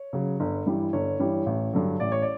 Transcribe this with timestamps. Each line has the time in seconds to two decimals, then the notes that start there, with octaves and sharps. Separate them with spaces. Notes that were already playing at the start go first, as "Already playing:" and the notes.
Already playing: C#5
0.13 C#3 F#3
0.40 G1
0.66 G2 E3 G3
0.93 G1 C#5
1.20 G2 E3 G3
1.46 A1
1.73 G2 D3 F#3
2.00 A1 D5
2.12 C#5
2.22 D5